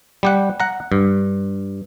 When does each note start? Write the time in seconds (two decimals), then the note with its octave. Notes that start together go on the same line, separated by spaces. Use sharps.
0.23 G3 G4 F#5
0.60 F#5 A#5
0.92 G2